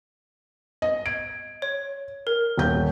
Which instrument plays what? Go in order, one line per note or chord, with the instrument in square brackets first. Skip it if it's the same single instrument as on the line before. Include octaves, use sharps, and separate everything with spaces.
[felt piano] D#5
[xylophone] G#6 [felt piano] D7
[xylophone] C#5
A#4
[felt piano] D#1 G6